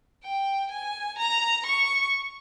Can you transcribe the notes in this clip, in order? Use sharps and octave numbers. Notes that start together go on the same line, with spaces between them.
G5
G#5
A#5
C#6